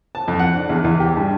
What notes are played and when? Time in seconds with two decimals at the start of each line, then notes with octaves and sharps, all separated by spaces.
0.15 A5
0.28 F2
0.39 F#5
0.55 D4
0.69 E2
0.84 E2
1.00 G4
1.17 G2